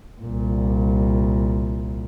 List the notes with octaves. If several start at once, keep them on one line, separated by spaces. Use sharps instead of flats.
C2 A#2